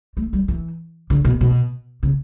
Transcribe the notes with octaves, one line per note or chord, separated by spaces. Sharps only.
A3
G3
E3
D3
B2
B2
C#3